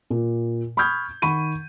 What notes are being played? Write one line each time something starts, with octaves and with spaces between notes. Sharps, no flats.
A#2
B5 C#6 D#6 F6 G6 G#6
D#3 F#5 B5 C#6 D#7